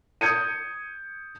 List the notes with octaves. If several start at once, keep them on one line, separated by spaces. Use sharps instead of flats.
D#6 G6 G#6 C#7 D#7